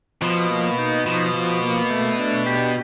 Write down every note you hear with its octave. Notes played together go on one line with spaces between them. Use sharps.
B2 F3
A#3
D#4
B2 F3
F3
A#3
A3
D4
G4